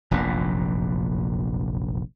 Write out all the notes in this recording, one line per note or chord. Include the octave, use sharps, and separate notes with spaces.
F1 A#1 F#2 A#2